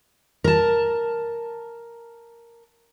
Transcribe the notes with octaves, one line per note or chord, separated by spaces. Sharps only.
A#4 A5